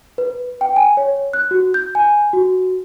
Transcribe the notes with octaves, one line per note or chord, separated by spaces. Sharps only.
B4
G5
G#5
C#5
F#6
F#4
G6
G#5
F#4